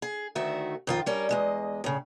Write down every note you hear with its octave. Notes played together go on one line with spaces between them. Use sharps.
G#4
D2 D#3 A3 F#4 E5
F2 D#3 F4
G3 C#4 A#4
E2 G#3 D#5
A2 C#3